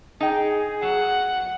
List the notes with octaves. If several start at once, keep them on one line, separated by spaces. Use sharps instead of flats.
D#4 G#4 G5
F#3 F#5